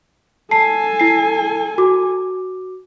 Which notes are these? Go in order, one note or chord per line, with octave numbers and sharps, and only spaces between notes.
A4 G#5 A5 C7
E4 C7
F#4 D6